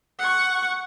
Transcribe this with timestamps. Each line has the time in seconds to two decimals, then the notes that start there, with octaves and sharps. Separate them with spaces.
0.18 F#5 C#6